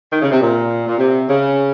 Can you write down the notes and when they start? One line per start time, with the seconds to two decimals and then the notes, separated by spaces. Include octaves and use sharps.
0.11 D#3
0.21 C#3
0.31 C3
0.41 A#2
0.87 A#2
0.98 C3
1.28 C#3